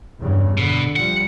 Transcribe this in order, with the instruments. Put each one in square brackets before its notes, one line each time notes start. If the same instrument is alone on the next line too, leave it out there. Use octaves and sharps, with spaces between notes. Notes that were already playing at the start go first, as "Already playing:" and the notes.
[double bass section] E2 G2 C#3
[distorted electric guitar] B2 [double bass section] D3
[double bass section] F3 G3 [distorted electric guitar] F#5